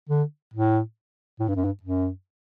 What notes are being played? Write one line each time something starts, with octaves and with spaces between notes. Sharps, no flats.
D3
A2
A2
G2
F#2
G2
F#2